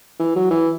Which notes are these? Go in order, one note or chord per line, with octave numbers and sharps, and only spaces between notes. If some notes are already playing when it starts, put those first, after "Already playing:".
E3
F#3
E3